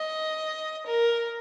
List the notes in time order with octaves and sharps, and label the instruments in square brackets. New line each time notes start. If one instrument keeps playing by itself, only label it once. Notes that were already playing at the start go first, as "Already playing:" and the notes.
Already playing: [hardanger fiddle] D#5
A#4